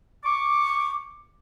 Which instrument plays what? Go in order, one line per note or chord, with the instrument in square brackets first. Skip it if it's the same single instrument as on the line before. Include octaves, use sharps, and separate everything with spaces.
[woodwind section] C#6 D6